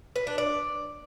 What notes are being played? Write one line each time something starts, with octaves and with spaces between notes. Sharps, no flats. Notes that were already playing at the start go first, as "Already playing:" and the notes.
B4
D4
D5